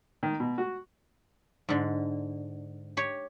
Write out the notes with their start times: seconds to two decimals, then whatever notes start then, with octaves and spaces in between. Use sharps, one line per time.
0.23 D#3
0.40 B2
0.58 F#4
1.69 G#2 D3
2.97 G4 C#5